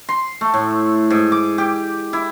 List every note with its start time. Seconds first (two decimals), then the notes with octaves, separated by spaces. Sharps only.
0.09 C6
0.41 A3
0.54 A2
1.10 G#2
1.32 D6
1.58 G4
2.13 E4